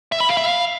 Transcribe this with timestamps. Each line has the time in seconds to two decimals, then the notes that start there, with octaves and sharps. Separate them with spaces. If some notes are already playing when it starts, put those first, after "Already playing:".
0.12 E5
0.20 B5
0.29 F5
0.37 E5
0.45 F5